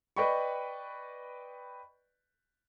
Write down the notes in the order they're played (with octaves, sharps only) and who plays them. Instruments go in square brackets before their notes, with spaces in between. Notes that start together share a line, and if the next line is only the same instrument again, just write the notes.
[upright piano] B4 D5 D#5 G5 B5 C#6